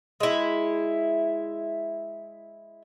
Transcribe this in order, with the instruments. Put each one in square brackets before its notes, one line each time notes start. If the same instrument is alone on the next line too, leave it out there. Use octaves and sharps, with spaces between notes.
[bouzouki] G#3 E4